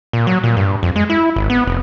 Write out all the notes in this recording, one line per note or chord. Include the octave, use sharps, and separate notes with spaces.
A#2
F#3
A#2
G2
F2
G#3
E4
G#1
B3
F1